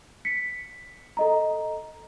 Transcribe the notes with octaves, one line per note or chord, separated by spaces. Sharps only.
B6 C#7
A4 D#5 A#5